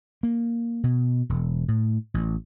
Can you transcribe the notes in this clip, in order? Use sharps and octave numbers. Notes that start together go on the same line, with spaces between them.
A#3
B2
E1
A2
A1